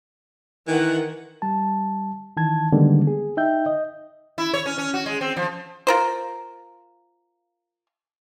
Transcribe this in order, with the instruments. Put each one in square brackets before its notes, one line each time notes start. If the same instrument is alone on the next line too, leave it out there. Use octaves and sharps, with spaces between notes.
[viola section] D#3 F#5 [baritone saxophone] E3
[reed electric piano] G3 A5
D#3 E3 A5 G#6
D3 D#3 G3 G#3 A#3 B3
G#4
D#4 E5 G5 G6
D#5
[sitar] E4
C#5
C#4
C#4
F#4
G#3
C4
F3
[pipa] F4 A#4 C5